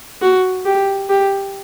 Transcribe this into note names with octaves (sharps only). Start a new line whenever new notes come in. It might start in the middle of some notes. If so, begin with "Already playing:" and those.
F#4
G4
G4